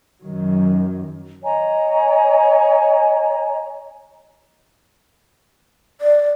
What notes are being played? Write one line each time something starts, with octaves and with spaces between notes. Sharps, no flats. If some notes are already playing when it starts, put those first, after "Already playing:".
F#2 D#3 F#3
C#5 D#5 G#5 A#5
D5